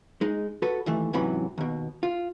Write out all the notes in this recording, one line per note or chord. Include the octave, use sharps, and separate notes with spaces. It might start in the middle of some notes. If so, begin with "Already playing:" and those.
G#3 D#4
F#4 A4 B4
D#2 E3 A3
G#2 C3 E3 F#3 C#4 B5
D#2 B2
F4